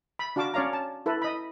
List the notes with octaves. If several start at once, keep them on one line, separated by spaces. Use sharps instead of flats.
B5
D4 F#4 F5 A5 D6
C#4 C#5 D5 F5 A#5
A5
E4 A4 B4
D#5 B5